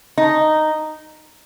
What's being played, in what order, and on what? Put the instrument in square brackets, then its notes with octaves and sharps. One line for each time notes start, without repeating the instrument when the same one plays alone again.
[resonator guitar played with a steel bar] D#4